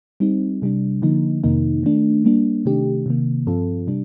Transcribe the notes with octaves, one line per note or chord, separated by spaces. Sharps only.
G3 C4 D#4
C3 G3 D4
D3 F3 A#3 D#4
F2 C3 D#3 A#3 D#4
D#3 A3 D4
G3 A#3 D4
C3 D#3 A3 D4 G4
C3 D#3 A#3
G2 F3 C4 F4 A4
C3 G3 D4